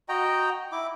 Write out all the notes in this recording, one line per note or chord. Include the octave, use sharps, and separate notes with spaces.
F#4 D#5 G5 A#5
E4 D6